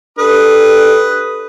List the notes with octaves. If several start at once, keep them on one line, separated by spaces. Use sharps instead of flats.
D4 G4 A4 B4 D#6